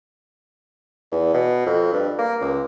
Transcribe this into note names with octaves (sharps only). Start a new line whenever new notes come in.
E2
B2
F2
G2
A#3
C#2